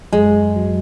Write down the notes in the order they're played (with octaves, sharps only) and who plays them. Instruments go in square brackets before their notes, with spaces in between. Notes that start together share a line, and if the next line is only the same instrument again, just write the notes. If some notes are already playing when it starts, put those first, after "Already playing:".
[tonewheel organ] F#2 [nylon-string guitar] G#3
[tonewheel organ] F#3